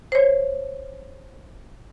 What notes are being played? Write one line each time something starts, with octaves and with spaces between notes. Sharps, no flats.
C5 C#5